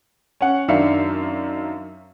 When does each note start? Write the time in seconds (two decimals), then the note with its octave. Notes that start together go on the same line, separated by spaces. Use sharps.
0.41 C#4 F#5
0.68 F#2 D#3 D4 E5 F5 C#7